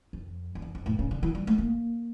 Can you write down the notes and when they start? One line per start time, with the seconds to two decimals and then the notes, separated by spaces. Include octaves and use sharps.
0.13 F2
0.55 F2
0.62 E2
0.75 F2
0.86 A2
0.99 C#3
1.11 D3
1.23 E3
1.35 G3
1.47 A3
1.58 A#3